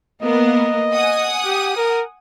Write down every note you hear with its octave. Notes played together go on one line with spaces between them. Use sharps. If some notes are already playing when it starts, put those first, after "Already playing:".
A#3 B3 A#4 D#5
F#5 G#5 D#6
G4
A#4